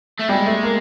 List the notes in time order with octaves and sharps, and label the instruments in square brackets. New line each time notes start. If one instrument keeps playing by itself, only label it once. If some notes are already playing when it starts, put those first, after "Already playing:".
[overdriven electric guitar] A3
[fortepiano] G3 [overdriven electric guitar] G#3
[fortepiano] A3
A#3